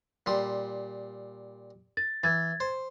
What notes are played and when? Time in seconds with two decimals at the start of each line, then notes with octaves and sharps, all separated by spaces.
0.26 A#2 G3 C6
1.97 A6
2.24 E3 G#6 A6
2.60 C5